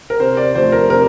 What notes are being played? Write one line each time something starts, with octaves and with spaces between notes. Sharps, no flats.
A#4
C3 C5
D5
F3 A3 C5
A#4
C3 A#4